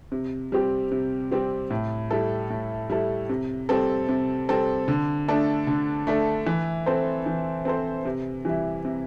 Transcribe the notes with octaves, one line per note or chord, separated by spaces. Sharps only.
C3
G3 C4 G4
C3
G3 C4 G4
A2
G3 E4 A4
A2
G3 E4 A4
C3
G3 C4 A4
C3
G3 C4 A4
D3
A3 D4 A4
D3
A3 D4 A4
E3
C4 A4 C5
E3
C4 A4 C5
C3
E3 G3 E4
C3